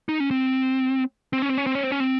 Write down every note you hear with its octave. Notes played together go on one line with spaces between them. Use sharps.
D#4
C#4
C4
C4
C#4
C4
C#4
C4
C#4
C4
C#4
C4